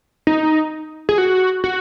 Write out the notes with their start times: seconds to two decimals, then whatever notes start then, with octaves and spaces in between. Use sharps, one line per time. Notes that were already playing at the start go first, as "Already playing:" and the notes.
0.27 D#4
1.09 G#4
1.18 F#4
1.64 F#4